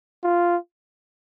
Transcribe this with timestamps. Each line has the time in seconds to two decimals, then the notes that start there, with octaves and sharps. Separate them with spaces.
0.24 F4